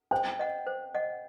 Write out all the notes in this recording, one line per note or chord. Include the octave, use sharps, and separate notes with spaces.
C5 G5
D#5 F#5
C5
D#5 F#5